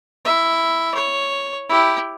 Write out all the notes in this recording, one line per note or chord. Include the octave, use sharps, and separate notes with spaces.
E4 E5
C#5
E4 G4